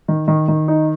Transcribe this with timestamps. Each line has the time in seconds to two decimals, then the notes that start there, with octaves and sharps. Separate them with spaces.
0.08 D#3
0.28 D#3
0.48 D#3
0.68 D#4